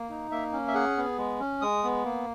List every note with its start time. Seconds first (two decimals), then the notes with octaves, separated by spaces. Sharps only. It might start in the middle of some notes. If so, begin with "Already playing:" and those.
Already playing: A#3
0.09 D#4
0.31 A#3 E5
0.52 C#4
0.68 E5
0.74 G#4 F#5
0.97 B3
1.18 G#3
1.40 C#4
1.62 G#3 D#6
1.83 B3
2.04 A#3